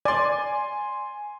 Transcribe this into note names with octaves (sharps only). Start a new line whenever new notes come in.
D5 G#5 C6